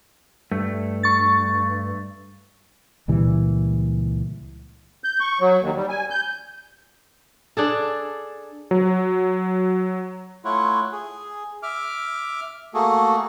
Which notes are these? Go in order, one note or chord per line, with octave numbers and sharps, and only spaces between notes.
G2 A3
C#6 A6
C#2 A#2 E3 G3
G6
C#6
F#3
D#2
G3
G#5
G6
D4 G#4 A4
F#3
A3 E4 F4 C#5 F#5
G#4
E5 D6 F6
A3 A#3 F#4 G#4 A4